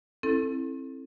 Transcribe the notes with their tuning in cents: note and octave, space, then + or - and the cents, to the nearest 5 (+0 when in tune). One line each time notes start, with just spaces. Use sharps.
C4 +30 E4 +0 A4 +0